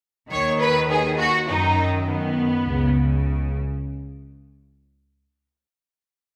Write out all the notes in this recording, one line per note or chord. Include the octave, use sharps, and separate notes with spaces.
D#2 D#3 C#5
B4
G#4
F#4
F#2 D#3 D#4
B3
C#2 C#3